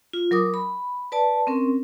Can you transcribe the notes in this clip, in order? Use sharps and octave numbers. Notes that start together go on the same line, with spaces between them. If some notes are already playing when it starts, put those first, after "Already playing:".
F4
F#3 A#4 D6 D#6
B5
B4 D5 A5
C4 C#4 A#4